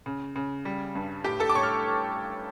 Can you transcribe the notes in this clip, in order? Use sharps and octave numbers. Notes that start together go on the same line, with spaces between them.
C#3
C#3
G3
G2
A2 G4 G5
A4 A5
D6
A3 C#5 C#6
F6